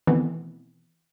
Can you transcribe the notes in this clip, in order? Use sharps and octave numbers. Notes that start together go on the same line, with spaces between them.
B2 D#3 E3 A3 B3 C4